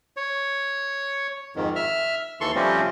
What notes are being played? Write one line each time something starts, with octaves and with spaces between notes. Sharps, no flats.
C#5
F2 G#2 D#3
E5 F6
D#2 E3 A4 C6 C#6
C3 F3 G3 A3 C4 C#4